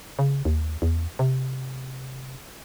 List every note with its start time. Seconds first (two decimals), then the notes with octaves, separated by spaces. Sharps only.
0.19 C#3
0.45 D#2
0.82 E2
1.19 C3